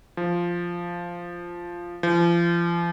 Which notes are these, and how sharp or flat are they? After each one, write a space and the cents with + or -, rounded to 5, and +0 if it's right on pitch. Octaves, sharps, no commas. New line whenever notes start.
F3 -5
F3 -35